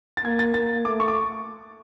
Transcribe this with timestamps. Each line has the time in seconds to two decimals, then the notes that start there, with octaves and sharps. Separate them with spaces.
0.17 A6
0.25 A#3 G#6
0.39 A6
0.54 A#3 A6
0.85 A3 D6
1.00 C#6
1.08 D6